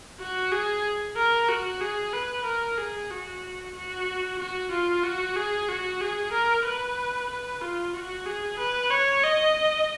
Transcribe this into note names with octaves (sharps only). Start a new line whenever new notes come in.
F#4
G#4
A#4
F#4
G#4
B4
A#4
G#4
F#4
F#4
F#4
F4
F#4
G#4
F#4
G#4
A#4
B4
B4
F4
F#4
G#4
B4
C#5
D#5